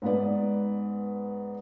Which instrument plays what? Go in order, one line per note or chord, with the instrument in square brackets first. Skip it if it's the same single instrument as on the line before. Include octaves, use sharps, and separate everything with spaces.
[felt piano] G#2 B3 B4 D5